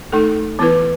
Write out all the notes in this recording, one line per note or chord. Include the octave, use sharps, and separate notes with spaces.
A3 D#4 A4
E3 B3 E4 B4